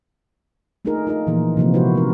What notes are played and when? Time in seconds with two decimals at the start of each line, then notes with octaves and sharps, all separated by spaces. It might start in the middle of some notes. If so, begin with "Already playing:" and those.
0.85 A3 D4 D#4 F4 G#4 A#4
1.07 D#4 F4 G#4 D#5
1.27 A#2 E3 F3 A#3 G#4
1.57 C3 E3 F3 A#3 C4
1.74 G#3 B3 E4 F#4 B4 C5
1.95 C4 D#4 A#4